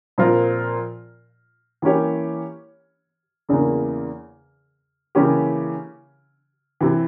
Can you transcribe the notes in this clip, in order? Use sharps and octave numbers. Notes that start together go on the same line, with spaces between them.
A#2 F3 C4 F4 A#4
E3 A#3 C#4 G4 C#5
E2 C#3 E3 A#3
C#3 E3 A#3 C#4 G4
C3 E3